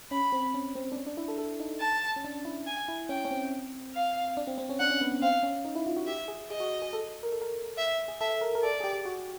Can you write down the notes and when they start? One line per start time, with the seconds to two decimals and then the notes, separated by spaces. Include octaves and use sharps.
0.11 C#4 B5
0.32 C4
0.54 C#4
0.75 C4
0.92 D4
0.96 C#4
1.06 D4
1.17 E4
1.28 A4
1.38 A4
1.60 D#4
1.81 A5
2.16 C#4
2.24 D4
2.45 E4
2.67 G#5
2.88 E4
3.09 C#4 G5
3.25 C#4
3.31 C4
3.94 F5
4.37 D4
4.47 C4
4.58 C4
4.69 C#4
4.80 D4 F#5
4.90 C#4
5.01 B3
5.12 B3
5.22 C4 F5
5.43 C#4
5.65 D#4
5.75 E4
5.86 F4
5.96 F#4
6.07 G4 E5
6.28 G#4
6.50 G#4 D#5
6.60 F#4
6.82 G#4
6.93 A4
7.23 A#4
7.32 A4
7.41 A#4
7.78 E5
8.08 G#4
8.21 A4 E5
8.41 A#4
8.55 A#4
8.63 A4 D5
8.80 G#4
8.84 G4
9.05 F#4